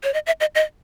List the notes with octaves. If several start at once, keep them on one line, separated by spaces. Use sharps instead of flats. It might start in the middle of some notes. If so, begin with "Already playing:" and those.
C#5
D#5
E5
D#5
D#5